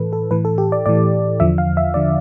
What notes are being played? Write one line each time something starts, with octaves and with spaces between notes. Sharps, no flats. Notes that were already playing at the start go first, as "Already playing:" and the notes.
Already playing: A2 E3 A4 B4
A4
A2 E3 B4
A4
G4
D5
A2 E3 D5
E2 D3 F3 E5
F5
E5
D3 F3 D5